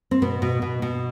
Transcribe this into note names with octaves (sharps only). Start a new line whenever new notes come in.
C4
B2 B3
B2
B2
B2